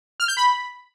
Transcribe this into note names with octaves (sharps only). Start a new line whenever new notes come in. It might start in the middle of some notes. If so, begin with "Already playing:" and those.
F6
G6
B5